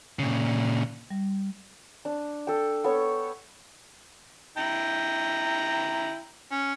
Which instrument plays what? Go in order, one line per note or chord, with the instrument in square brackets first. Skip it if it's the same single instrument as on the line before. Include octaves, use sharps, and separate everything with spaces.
[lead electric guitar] A#2 C#3
[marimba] G3
[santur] D4
A4 G5
B3 A4 C#5 C#6
[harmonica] E4 G5 A#5
C#4